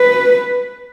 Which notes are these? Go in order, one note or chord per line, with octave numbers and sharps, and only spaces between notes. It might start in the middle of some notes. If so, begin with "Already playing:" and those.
Already playing: B4